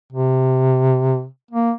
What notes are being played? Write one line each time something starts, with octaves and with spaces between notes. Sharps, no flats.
C3
A#3